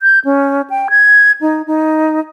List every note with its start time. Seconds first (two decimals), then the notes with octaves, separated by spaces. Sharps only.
0.02 G6
0.25 C#4
0.70 G5
0.90 G#6
1.41 D#4
1.67 D#4